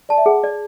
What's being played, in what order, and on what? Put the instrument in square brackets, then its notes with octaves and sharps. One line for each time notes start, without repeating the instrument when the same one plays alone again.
[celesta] D5 [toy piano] A5
[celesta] E5
[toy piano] G#4 [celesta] F#5
[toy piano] D5